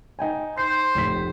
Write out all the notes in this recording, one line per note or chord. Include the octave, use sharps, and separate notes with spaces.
D#4 G5 G#5
C5 C7
F1 A2 B6